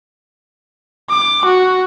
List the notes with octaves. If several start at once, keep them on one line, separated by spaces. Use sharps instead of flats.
D6
F#4